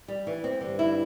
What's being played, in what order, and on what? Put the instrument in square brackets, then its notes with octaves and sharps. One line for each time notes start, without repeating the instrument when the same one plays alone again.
[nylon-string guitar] G3
E3
C4
[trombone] G2 [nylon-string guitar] D3
[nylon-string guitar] E4